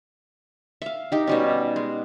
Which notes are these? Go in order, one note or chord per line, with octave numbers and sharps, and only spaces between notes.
E5 F5
D#4 G4
B2 G3 C#4
G#3